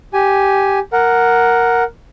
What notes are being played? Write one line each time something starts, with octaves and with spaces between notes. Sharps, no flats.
G4 G#5
A#4 F#5